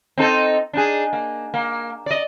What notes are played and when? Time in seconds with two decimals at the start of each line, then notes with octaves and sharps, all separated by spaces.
0.18 C4 D#4 A4
0.73 D4 D#4 G#4
1.13 A#3
1.54 A#3
2.06 D5 D#5